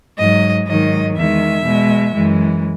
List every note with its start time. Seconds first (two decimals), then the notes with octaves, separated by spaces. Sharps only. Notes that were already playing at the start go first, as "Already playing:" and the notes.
0.18 G#2 F#3 D#5
0.68 G#2 D#3 F#3 D#5
1.17 E2 D#3 G#3 E5
1.64 B2 G#3
2.14 F#2 E3 G#3